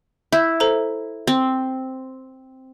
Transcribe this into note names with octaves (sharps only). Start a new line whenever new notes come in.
E4 G6
A4 C5 A#5
C4